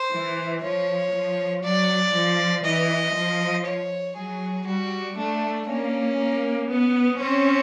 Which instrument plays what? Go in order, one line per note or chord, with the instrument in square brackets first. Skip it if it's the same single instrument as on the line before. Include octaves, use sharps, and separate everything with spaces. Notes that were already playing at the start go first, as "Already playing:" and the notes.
Already playing: [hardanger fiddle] C5
[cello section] E3
[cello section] F3 [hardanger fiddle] C#5
[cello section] F3
[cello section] F#3 [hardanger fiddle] D5
[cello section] F3
[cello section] E3 [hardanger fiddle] D#5
[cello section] F3
[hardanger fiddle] C#5
[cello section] F#3 [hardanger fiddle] G#4
[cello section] G3 [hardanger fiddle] F#4
[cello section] A3 [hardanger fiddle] D4
[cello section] A#3 [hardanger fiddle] C#4
[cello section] A#3
B3
[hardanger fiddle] C4 [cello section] C#4